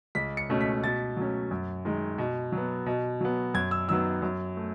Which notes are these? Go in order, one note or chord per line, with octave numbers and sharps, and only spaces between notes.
C#2 B6
C#7
B2 A3 C#4
B6
B2 A6
F#3 A3 C#4
F#2
D#3 G#3
B2
F#3 B3
B2
F#3 B3
F#2 G#6
E6
D#3 F#3 B3 E6
F#2
A3